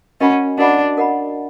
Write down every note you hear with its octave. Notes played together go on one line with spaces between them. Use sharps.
C#4 F#4 A#4 D#5 F#5 B5
D4 F#4 A#4 D#5 F#5 B5
F#4 A#4 D#5 F#5 B5